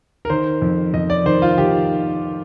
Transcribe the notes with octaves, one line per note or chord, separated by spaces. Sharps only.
A#4
D#3 C5
F2
F2 D#5
D5
D#3 C5
F4
D#3 G4